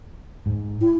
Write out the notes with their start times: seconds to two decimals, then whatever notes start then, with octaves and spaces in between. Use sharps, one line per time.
0.46 G#2
0.81 E4